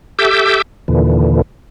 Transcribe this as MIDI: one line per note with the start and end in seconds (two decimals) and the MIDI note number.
0.19 0.62 67
0.19 0.62 69
0.19 0.62 76
0.19 0.62 86
0.19 0.62 88
0.19 0.62 91
0.88 1.42 39
0.88 1.42 46
0.88 1.42 50
0.88 1.42 52